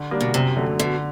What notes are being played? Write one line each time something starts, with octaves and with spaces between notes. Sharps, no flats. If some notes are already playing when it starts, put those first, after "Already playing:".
Already playing: D3
G3 A#3 D4
B2
F#2 C3
D3 F#3 A3
B2 D3